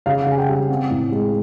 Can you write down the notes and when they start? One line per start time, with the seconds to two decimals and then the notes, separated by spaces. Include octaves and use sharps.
0.06 C#3 F5
0.22 F#5
0.27 C#3 G#5
0.38 G5
0.48 G3
0.53 F#5
0.69 C4
0.90 A2
1.12 G#3